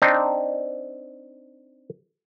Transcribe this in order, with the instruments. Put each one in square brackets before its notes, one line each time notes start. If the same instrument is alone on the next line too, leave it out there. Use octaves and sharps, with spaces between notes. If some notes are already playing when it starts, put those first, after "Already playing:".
[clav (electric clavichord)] C4 D4 D#4